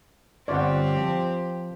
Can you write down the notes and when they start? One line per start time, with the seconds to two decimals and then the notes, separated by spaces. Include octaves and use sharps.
0.48 G1 C4 F4 G4 C#5 D5 F#5
0.97 F3